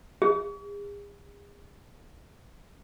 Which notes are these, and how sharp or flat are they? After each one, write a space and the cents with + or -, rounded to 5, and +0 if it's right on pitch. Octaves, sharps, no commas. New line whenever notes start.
G#4 -40